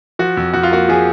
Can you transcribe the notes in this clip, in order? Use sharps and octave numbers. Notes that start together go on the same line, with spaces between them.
F3 F#4
F2
F2 F#4
F4
A#3 F#4
F3 G#4